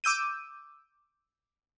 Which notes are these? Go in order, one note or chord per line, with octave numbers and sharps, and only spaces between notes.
D6 E6 G6 D#7